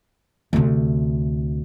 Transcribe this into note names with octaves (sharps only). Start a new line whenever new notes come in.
D2 C3